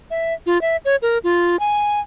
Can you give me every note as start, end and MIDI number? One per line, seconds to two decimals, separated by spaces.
0.11 0.34 76
0.46 0.61 65
0.61 0.77 76
0.85 0.96 73
1.02 1.18 70
1.24 1.59 65
1.60 2.00 80